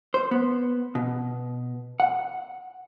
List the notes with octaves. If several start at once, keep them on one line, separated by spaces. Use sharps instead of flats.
C5
B3
B2
F#5